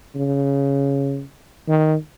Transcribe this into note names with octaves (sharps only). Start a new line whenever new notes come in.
C#3
D#3